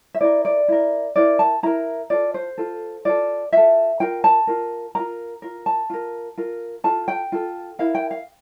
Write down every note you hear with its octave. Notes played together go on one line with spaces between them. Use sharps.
E5
E4 A#4 D5
D5
E4 A#4
E4 A#4 D5
A5
E4 A#4 A#5
F4 A4 D5
C5
F4 A4
F4 A4 D5
F4 A4 E5
F4 A#4 G5
A5
F4 A#4
F4 A#4 A#5
F4 A#4
A5
F4 A#4
F4 A#4
F4 A4 A5
G5
F4 A4
E4 A#4 F5
G5
F5